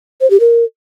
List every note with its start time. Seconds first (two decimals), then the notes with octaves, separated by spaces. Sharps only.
0.21 C5
0.30 G4
0.40 A#4